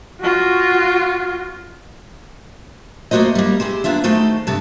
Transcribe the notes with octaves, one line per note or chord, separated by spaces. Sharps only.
F4 F#4
A3 A#3 C4 F#4 C5 D#5
G3 A#3
G#3 C4 E4 G4
A#3 B3 D4 F4 E5
D#3 G#3 A3 F#4 A4 C5
G2 C3 A4 D#5 A5